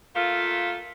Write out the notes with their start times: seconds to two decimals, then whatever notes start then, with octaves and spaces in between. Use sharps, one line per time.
0.15 A3 A#3 F4